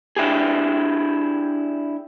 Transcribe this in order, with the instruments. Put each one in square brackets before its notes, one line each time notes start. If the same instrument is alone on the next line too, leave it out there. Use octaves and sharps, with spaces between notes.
[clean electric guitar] D4 E4 G4 G#4